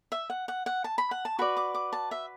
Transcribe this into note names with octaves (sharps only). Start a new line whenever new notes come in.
E5
F#5
F#5
F#5
A5
B5
F#5
A5
F#4 B4 D5 B5
D6
D6
A5
E5